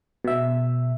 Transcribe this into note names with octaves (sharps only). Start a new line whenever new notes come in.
B2 E5